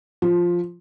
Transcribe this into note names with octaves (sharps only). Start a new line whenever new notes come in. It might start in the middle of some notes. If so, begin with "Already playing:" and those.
F3